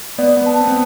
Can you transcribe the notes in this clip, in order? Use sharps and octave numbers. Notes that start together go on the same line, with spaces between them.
B3 D5
B3
A5
C4
B3